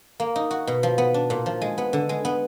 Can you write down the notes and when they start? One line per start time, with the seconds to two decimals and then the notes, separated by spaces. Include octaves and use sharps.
0.20 A#3
0.36 D#4
0.51 F#4
0.67 B2
0.83 F3
0.98 B3
1.14 D4
1.30 A#2
1.46 F3
1.62 G#3
1.78 B3
1.93 D3
2.09 G#3
2.25 B3